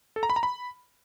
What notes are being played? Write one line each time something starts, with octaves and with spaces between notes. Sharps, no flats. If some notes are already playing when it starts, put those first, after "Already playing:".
A4
A#5
B5
A#5
B5